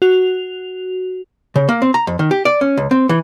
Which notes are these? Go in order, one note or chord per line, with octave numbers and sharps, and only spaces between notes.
F#4 F7
C#3
A#3
C4
A#5
F2
D#3
G4
D5
C#4
C#2
C4
E3